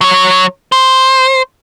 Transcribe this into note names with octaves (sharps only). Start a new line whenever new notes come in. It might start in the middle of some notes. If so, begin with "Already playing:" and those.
F#3 C#5
C5